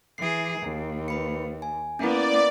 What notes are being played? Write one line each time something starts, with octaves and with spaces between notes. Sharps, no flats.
E3 G#4 C7 D7
D#2
B4 B5 C#7
G#5
A#3 B3 C#4 E4 D5